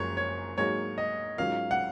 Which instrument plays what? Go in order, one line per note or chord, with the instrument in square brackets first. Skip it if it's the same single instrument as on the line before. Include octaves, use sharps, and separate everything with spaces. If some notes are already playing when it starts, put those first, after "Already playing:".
Already playing: [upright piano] F#1 F#2 F3 G#3 [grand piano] C#5
[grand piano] C#5
[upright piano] G#2 F#3 A#3 D#4 G#4 [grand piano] C#5
[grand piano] D#5
[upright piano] G#2 F#3 C#4 F4 A#4 [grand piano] F5
[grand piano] F#5